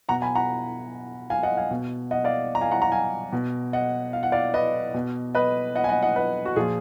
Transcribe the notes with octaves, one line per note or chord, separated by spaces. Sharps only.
B2 F#5 A#5
G#5 B5
F#5 A#5
F5 G#5
D#5 F#5
F5 G#5
B2
D#5 F#5
D5 F5
A#5
F5 G#5
F#5 A#5
F#5 A#5
F5 G#5
B2
D#5 F#5
F5
F#5
D5 F5
B4 D#5
B2
B4 D#5
D#5 F#5
G#5
D#5 F#5
D#5 F#5
B4 D#5
F#4
A#2 F3 F4 G#4